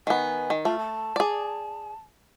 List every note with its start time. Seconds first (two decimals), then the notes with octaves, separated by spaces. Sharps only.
0.07 D#3 B3 G#5
0.50 D#3
0.65 A3 F4
0.79 A5
1.16 G#4 D5